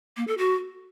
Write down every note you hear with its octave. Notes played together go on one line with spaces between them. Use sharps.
A#3
A4
F#4